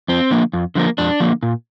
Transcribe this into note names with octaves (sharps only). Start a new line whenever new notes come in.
F2 C4
D3 F3 A#3
F2
D3 F3 A#3
F2 D4
D3 F3 A#3
A#2